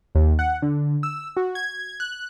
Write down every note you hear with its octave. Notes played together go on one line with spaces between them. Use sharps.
D#2
F#5
D3
E6
F#4
G#6
F#6